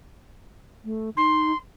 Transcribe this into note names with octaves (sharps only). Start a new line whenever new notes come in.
A3
D#4 C6